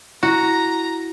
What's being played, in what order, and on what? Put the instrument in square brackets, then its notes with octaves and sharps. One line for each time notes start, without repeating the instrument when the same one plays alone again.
[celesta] E4 [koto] F#4 [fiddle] A#5